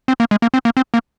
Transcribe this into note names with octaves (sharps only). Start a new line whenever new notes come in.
C4
A#3
G#3
A#3
C4
A#3
C4
A#3